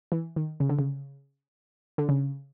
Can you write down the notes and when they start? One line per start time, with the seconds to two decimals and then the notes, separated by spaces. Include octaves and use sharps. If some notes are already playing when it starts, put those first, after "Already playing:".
0.12 E3
0.36 D#3
0.60 C#3
0.69 D3
0.79 C#3
1.98 D3
2.09 C#3